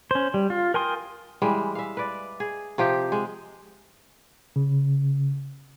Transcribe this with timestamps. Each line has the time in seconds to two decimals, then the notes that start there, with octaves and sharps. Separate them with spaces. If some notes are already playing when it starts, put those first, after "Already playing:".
0.11 C#4 C5
0.34 G3
0.50 F4
0.74 A#4 G5 G#5 C6 D#6
1.42 E3 G3 G#3
1.75 E5 F5
1.97 B4 D5
2.40 G#4
2.78 C3 F3 G4 D#5
3.12 G#3
4.56 C#3